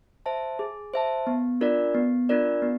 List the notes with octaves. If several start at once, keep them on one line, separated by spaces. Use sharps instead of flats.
C5 E5 A5
G#4
C5 E5 A5
B3
D4 F4 A#4 D5
B3
D4 F4 A#4 D5
B3